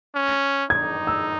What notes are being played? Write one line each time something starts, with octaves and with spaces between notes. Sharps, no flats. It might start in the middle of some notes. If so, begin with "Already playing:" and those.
C#4
D#4 G#6
E6